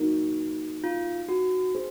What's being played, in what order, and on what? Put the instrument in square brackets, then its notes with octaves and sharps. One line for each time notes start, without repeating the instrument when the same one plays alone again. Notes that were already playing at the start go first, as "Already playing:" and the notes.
Already playing: [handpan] A#3 D#4 F#4 A#4
[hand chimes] F4
F#4
[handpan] G#4 C5